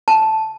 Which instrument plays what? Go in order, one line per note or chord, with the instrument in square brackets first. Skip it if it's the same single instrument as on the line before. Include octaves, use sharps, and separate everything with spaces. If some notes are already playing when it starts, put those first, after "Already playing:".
[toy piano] A5